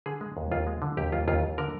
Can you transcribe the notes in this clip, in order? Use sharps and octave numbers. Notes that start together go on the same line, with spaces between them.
D3 G#4
G#3
D#2
D#2 F4
G#3
D3
D#2 G4
D#2 F4
D#2 F4
D#2
D3 A#4